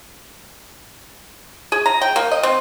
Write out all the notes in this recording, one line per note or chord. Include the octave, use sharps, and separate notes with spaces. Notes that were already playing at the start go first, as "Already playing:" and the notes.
G#4
A#5
G5
A#3
D#5
C4